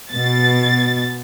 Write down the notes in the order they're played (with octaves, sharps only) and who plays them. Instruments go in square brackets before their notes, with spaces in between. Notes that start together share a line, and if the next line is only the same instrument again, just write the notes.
[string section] B2 A6